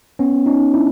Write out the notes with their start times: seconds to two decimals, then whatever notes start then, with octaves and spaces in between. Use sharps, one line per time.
0.19 B3 C#4
0.46 C#4 D#4
0.74 D4 E4